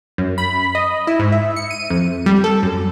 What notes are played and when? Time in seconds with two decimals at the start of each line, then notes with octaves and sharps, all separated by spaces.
0.18 F#2
0.38 B5
0.75 D#5
1.07 E4
1.19 G#2
1.32 E5
1.56 C#7
1.70 D#7
1.90 F2
2.26 G3
2.44 A4
2.63 F#2